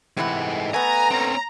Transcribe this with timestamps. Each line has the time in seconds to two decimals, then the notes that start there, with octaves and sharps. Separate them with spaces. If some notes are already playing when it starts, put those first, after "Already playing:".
0.17 G#2 C3 E3 A3 F#5
0.74 A3 B3 G#5 A#5
1.11 C4 C#4